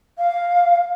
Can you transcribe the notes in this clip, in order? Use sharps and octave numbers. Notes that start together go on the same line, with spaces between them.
F5